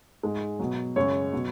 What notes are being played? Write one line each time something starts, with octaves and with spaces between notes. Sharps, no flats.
G#2 G#3
B2 F#3
F#2 C#3 G#3 C#5
B2 F#3